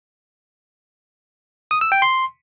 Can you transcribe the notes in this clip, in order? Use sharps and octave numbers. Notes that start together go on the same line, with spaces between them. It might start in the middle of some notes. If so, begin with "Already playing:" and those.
D#6
E6
G5
C6